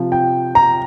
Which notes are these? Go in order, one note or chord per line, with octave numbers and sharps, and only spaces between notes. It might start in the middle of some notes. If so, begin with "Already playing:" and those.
Already playing: C3 F3
G5
A#5